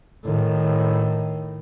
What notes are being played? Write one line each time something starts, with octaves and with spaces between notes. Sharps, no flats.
A2 D#3